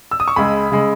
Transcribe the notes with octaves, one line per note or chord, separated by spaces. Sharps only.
E6
D#6
C#6
C#2 C#3 G#3 B5
C#3 G#3